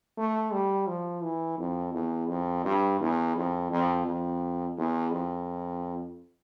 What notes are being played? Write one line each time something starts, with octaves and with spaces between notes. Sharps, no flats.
A3
G3
F3
E3
F2
E2
F2
G2
E2
F2
F2
F2
E2
F2